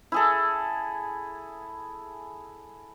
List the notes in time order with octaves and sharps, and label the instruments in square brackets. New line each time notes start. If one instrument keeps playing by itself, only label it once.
[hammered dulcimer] E4 G#4 A4